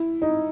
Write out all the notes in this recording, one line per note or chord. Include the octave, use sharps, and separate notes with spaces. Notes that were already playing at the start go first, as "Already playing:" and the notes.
Already playing: E4
D#4